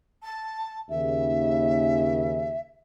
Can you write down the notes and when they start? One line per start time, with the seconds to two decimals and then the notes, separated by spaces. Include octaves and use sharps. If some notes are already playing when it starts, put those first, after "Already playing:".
0.22 A5
0.90 D#2 C#3 E5